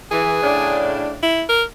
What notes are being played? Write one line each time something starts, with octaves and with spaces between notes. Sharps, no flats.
E3 G#4
A2 C#3 D4
E4
A#4